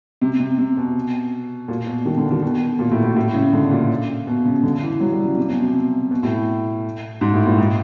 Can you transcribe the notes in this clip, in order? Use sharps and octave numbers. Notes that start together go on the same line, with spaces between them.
C3
C3
C3
B2
A#2
B2
D#3
D3
D#3
B2
A#2
A2
A2
A2
C#3
D3
A#2
B2
C#3
D3
E3
F#3
G3
C#3
C3
B2
C3
B2
A2
G#2
A2
A#2
G#2